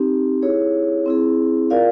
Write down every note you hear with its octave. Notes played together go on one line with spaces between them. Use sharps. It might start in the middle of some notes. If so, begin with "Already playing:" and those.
Already playing: C4 D#4 G4
E4 G#4 C#5
C4 E4 G#4
F4 A#4 D5 F5